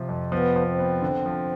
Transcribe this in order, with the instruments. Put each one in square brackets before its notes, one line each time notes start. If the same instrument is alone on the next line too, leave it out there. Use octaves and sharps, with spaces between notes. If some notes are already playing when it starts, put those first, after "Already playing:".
Already playing: [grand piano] C3 F3
F2
[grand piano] F3 [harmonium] B3
[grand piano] F3
[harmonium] C4
[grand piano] B3
D3
F3